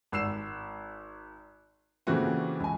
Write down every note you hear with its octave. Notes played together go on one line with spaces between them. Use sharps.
G#1 E6 C7 E7
A#2 C#3 E3 A3 C4 F#4
C#2 G#5